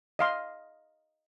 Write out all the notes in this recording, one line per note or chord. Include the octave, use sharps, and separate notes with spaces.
D#5 F5 C6